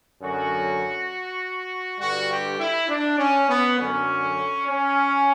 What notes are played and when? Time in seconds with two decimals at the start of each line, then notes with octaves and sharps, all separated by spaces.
0.22 F#2 D3 F#3 F#4
1.99 G2 D3 G3 F#4
2.29 G4
2.59 E4
2.89 D4
3.18 C#4
3.49 B3
3.78 F#2 D3 F#3 C#4
4.67 C#4